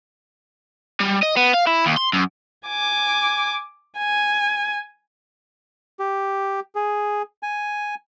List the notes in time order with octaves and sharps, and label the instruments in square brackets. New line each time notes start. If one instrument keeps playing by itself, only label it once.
[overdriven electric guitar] G3
D#5
B3
F5
E4
D#2
C6
F#2
[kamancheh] G#5 D6
G#5
[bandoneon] G4
G#4
G#5